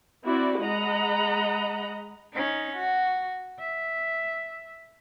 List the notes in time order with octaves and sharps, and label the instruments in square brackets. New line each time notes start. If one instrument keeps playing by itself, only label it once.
[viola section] C4 E4 F#4 D5
G#3 D#5 F#5 A#5 B5
[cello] C#4 D#4
F#4
E5